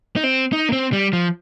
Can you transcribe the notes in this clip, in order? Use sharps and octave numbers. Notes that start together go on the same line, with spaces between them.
D#4
C4
D#4
A#3
C4
G3
F3